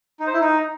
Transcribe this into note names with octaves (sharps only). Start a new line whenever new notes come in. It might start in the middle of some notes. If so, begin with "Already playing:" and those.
D#4
C5
E4
D#4